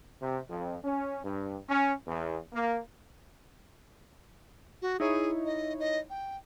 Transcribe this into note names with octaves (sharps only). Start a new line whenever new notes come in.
C3
F2
C#4
G2
C#4
E2
A#3
F#4
D#4 E4 G#4 C#5
D#5
D#5
G5